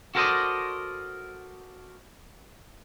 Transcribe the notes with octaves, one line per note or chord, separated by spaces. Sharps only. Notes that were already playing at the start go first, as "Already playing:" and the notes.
F#4 A4 A#4 C5 D5 D#5